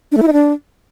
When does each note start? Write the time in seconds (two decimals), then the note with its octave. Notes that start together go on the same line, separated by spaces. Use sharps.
0.12 D4
0.17 A3
0.22 E4
0.28 D#4
0.33 D4